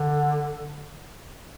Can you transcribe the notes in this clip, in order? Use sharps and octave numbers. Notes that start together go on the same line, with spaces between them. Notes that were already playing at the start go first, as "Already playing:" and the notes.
Already playing: D3